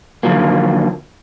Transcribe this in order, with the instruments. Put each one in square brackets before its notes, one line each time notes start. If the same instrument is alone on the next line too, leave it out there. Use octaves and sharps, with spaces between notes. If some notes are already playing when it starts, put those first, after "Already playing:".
[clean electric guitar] D3 D#3 F3 F#3 A#3